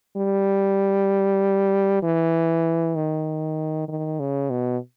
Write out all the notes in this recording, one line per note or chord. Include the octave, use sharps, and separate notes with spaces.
G3
E3
D#3
D#3
C#3
B2